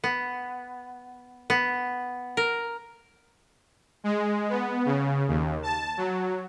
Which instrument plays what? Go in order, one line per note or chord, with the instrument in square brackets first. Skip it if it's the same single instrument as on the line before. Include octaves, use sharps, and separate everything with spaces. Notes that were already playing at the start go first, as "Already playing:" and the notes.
[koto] B3
B3
A#4
[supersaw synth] G#3
B3
C#3
D#2
A5
F#3